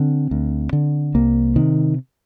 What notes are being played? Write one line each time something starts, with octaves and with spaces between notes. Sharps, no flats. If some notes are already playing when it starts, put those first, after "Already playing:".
Already playing: D3 C4
D2
D3
C2 A#3
C3 D#3